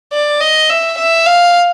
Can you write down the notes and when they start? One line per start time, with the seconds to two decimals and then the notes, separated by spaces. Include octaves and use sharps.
0.13 D5
0.41 D#5
0.70 E5
0.98 E5
1.26 F5